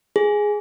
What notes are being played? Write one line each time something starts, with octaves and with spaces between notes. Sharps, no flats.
G#4